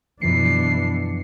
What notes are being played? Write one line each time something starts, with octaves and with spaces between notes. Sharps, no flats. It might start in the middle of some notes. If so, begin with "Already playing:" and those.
F#2 B2 E3 F3 D4 C7 C#7